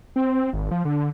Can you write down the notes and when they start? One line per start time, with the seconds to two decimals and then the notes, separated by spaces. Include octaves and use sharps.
0.16 C4
0.31 C4
0.53 G#1
0.71 F3
0.85 D3